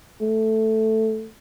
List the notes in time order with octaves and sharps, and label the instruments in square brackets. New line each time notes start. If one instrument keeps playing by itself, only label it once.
[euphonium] A3